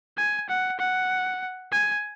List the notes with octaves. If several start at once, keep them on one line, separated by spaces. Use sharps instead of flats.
G#5
F#5
F#5
G#5